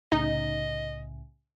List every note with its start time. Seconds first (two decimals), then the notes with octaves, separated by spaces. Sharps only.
0.12 C2 A2 C#3 D#4 D#5